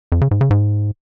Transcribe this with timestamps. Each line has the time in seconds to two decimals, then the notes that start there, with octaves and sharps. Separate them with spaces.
0.12 F2
0.21 C#3
0.31 G#2
0.41 C#3
0.50 G#2